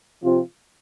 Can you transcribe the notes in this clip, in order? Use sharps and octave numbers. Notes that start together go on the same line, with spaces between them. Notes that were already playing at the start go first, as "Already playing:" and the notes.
C3 F3 C4 F4